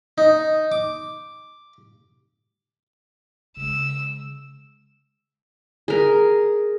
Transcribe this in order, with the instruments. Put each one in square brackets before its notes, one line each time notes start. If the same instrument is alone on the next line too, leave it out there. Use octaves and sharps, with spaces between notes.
[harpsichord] D#4
D6
[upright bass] C#3 G#3 [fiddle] E6
[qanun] G#4 A#4